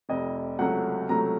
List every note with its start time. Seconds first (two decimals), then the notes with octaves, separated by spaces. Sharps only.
0.09 F1 F2 C3 D#5
0.59 C#2 C3 F#3 A3 F#5
1.09 C#2 C3 F#3 A3 A#5